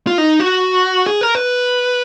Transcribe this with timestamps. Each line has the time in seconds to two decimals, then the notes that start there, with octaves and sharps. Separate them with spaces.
0.07 F4
0.18 D#4
0.40 F#4
1.06 G#4
1.21 A#4
1.35 B4